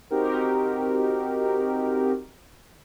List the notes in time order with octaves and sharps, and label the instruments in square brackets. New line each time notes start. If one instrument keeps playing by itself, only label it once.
[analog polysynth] C4 D#4 F#4 G4 A#4